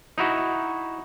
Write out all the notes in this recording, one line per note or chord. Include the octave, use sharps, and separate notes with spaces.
D#4 E4 F#4